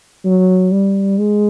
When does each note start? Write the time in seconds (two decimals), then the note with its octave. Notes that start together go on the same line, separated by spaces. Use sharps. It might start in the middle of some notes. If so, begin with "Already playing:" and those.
0.25 F#3
0.72 G3
1.19 G#3